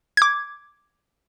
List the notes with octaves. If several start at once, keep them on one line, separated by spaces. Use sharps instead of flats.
D6 G#6